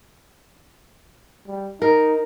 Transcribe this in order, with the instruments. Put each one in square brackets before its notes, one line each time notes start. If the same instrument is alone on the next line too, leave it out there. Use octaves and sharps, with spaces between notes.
[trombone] G3
[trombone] D#4 [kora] A#4